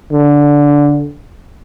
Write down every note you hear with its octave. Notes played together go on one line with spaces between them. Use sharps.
D3